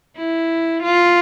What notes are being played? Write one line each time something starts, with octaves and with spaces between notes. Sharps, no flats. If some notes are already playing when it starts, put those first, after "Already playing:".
E4
F4